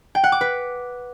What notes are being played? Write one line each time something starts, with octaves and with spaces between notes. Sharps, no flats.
G5
F#5
D6
B4